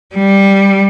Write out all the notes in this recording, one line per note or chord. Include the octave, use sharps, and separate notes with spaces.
G3